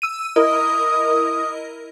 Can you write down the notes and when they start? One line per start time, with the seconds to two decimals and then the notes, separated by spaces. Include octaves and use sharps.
0.02 E6 D#7
0.36 E4 A#4 D#5 D#6